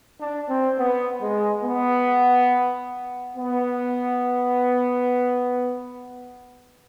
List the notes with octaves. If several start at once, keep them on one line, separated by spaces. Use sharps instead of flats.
D4
C4
B3
G#3
B3
B3